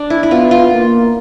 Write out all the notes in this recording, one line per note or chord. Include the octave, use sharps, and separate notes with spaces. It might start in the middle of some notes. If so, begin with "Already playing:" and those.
Already playing: D4
E4
E4
B3 F4
F4
A#3